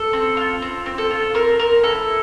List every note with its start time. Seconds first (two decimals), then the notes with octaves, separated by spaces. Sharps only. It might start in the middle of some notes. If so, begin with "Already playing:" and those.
Already playing: A4
0.13 C4
0.37 F4
0.62 C4
0.86 C4
0.98 A4
1.11 F4
1.34 C4 A#4
1.59 C4 A#4
1.84 E4 A4